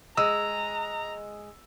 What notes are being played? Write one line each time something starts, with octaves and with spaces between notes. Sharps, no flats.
G#3 A#5 E6